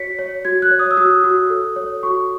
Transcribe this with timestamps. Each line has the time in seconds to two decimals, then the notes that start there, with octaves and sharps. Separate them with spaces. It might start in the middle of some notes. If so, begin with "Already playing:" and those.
Already playing: F#4 C#5 B6 C#7
0.19 C#5
0.45 F#4 G#6
0.62 F#6
0.71 C#5
0.79 D#6
0.91 E6
0.97 F#4 D#6
1.24 F#4
1.50 A4
1.76 C#5
2.03 F#4 C#6